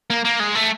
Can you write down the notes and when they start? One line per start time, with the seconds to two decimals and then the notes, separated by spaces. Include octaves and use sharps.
0.10 A#3
0.25 A#3
0.40 G#3
0.55 A3